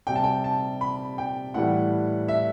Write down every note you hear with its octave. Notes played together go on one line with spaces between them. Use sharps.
C3 G3 G5
A5
G5
A5
B5
G5
A2 E3 G3 F#5
E5